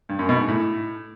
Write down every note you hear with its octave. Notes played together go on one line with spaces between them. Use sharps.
G2
F#2
B2
G#2
A2